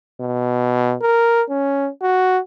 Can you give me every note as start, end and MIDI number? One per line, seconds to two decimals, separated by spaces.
0.21 0.95 47
1.02 1.42 70
1.49 1.89 61
2.02 2.39 66